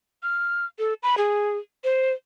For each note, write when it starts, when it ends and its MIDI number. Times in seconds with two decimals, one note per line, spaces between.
0.23 0.65 89
0.79 0.94 69
1.03 1.15 83
1.17 1.58 68
1.84 2.12 72